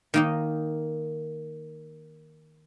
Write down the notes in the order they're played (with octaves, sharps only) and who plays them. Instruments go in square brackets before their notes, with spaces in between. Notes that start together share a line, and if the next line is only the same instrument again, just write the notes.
[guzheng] D#3 A#3 D#4